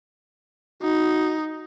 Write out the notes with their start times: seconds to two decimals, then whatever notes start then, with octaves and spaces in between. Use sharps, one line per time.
0.82 D#4 F#4